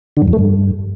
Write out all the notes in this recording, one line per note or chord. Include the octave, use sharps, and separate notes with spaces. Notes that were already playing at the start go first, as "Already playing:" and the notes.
D3
G2
F2
A3
G2